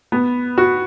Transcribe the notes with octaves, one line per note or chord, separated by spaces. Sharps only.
B3
F#4